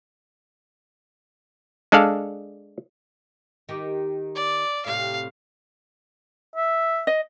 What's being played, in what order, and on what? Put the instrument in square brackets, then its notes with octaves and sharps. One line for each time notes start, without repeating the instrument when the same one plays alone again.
[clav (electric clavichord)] G#3 D4 A4 D5 F5
[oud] D#3 G4
[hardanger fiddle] D5
[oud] A2 C3 [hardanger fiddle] F5
[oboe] E5
[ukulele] D#5